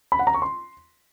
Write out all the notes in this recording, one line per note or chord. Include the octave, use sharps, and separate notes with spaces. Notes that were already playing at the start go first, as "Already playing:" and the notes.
B5
F#5
A#5
C#6
C6